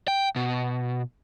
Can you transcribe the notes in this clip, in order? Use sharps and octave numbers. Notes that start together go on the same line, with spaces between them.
G5
B2